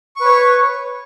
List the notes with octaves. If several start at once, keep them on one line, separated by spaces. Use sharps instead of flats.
B4 C#5 C#6